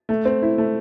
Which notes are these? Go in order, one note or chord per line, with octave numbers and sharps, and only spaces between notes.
A3
C4
E4
A3